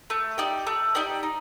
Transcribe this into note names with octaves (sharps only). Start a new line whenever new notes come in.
A3
D#4 G4 D5
A3
D#4 G4 D5
D#4